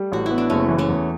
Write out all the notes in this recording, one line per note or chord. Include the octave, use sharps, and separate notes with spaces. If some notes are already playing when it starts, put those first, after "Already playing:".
Already playing: G3 A3
A1 F#4
B3 E4
D4
F#1 A3 C#4
E3
A3 C#4
E2